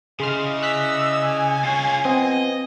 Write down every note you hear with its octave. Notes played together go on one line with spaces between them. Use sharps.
C#3 E4 G#4 D5 D#5 C6 F6
E6 F#6 B6
G#5
C#4 F4 G#4
F3 B3 C4 D#5